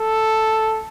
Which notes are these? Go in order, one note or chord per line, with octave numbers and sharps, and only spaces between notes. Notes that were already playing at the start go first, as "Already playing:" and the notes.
Already playing: A4